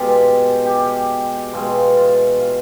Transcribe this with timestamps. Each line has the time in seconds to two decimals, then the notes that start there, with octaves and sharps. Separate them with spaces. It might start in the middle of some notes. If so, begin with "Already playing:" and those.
Already playing: B2 G#3 F4 G4
0.65 G4
1.53 B2 G#3 F4
1.97 F4
2.40 F4